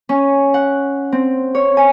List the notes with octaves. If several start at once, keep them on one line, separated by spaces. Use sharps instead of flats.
C#4
F#5
C4
C#5
G#5